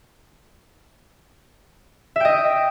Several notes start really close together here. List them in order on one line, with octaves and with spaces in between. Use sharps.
E5 G5 D#5